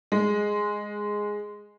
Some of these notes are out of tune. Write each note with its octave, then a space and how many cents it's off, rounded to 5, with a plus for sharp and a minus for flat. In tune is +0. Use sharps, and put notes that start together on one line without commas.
G#3 -5